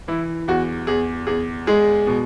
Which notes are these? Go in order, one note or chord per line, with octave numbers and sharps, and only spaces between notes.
E3 E4
E2 F#4
E2 G#4
E2 G#4
G#3 G#4
B2